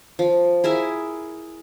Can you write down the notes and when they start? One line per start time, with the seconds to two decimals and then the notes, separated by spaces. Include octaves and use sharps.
0.19 F3
0.64 E4 G#4 A#4 E5